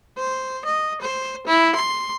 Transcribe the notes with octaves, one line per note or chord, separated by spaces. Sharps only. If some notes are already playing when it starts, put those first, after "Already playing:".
C5
D#5
C5
E4
C6